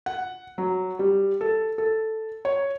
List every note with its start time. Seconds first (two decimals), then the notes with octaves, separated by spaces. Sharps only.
0.06 F#5
0.58 F#3
0.99 G3
1.41 A4
1.78 A4
2.45 C#5